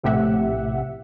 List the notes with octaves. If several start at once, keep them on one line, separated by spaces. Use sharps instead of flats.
A#1 A2 C3 G4 E5 F#5